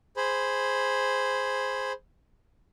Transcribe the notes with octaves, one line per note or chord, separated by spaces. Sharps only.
G#4 C5 B5